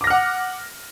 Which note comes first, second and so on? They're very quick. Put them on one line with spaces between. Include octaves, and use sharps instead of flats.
D6 A#6 F6 F#5